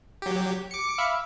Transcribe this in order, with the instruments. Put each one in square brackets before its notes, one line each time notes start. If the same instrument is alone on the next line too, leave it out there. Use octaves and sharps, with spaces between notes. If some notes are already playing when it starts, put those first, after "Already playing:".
[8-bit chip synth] F#3 G4
D6 C#7
[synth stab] E5 F5 B5